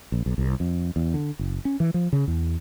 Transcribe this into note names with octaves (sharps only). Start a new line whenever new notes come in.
A#1
B1
C2
F2
E2
D3
F#1
C#4
E3
F3
C#3
E2